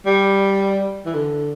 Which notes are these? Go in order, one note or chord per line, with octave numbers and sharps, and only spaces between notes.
G3
E3
D3